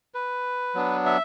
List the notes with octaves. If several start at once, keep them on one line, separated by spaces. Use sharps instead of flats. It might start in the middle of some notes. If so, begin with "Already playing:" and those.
B4
F#3 B3 D4
E5